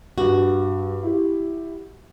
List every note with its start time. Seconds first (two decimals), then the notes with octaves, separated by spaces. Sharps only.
0.18 G2 F#4
1.03 E4 G4